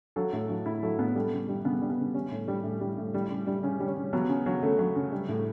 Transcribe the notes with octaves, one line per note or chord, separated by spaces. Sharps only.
F#3 A4
A2
F#3
A2 E4
F#3 A4
A2 B3
G3 A3
C#3
G3
C#3 B3
G3
B3
C#3
G3 C#4
A2
G3
A2
G3
A2
G3
C#3
G3
C#3 C#4
G3
C#4
C#3
F#3 B3
C#3
F#3
C#3 A3
F#3
C#3
G3
A2